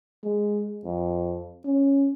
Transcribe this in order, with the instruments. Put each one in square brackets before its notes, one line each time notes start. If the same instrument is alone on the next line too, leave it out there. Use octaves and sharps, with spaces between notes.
[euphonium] G#3
F2
C#4